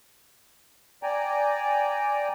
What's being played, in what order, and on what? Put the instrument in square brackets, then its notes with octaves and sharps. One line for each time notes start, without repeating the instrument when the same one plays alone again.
[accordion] D5 G5 G#5 A#5